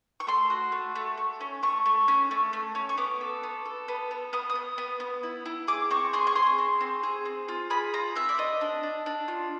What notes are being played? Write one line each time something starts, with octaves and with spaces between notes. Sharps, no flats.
C#6
A3 C6
F#4
A3
A3
A3
C#4
A3 C#6
A3
C#4
A3
A3
C#4
C#6
B3 D6
A4
B3
A4
B3
B3
B3 D#6
D#6
B3
B3
B3
E4
E4
G#4 D6
C4 C#6
G#4 C6
C#6
G#4 C6
C4
C4
G#4
C4
F4
G#4 B5
F4 A#5
C4 E5
D5
D4 D#5
D4
D4
D4
F4